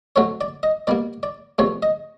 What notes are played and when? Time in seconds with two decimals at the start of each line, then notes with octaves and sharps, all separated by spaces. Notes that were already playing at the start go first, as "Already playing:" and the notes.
0.16 D3 F#3 A3 C4 C#5
0.41 D5
0.63 D#5
0.87 B2 G3 A#3 D5
1.23 D5
1.58 E2 C3 F3 A3 C#5
1.83 D#5